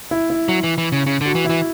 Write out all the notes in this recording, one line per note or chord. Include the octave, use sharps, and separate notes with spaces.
E4
E4
F#3
E3
E3
C#3
C#3
D3 F#4
E3
E4
E3